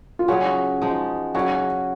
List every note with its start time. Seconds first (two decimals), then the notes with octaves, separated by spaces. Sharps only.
0.19 F4
0.28 C#3 F#3 C#4 F#4 G#4
0.82 F3 G#3 D#4
1.35 C#3 F#3 C#4 F#4